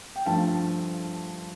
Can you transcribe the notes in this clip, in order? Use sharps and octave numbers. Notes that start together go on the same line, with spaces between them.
G5
G2 F3 A3 F5 A5